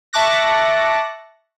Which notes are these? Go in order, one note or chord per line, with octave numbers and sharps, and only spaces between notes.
E5 A5 C#6 D6 F#6 A#6